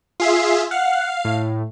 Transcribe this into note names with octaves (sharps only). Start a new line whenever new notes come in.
F4 G#4 E5 C7
F5 F#5
A2